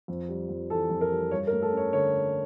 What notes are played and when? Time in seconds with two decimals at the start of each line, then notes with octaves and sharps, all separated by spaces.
0.08 F2
0.29 G3
0.49 F2
0.70 E3 A4
0.90 F2
1.01 A#4
1.11 G3
1.31 G2 C#5
1.47 A#4
1.52 A3
1.62 A4
1.72 C#4 C#5
1.93 D3 C#5